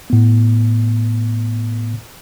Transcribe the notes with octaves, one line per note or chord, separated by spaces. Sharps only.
A2 B3